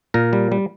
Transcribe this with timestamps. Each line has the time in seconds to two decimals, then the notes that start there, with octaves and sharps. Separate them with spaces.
0.14 A#2 A#4
0.33 G3
0.52 G3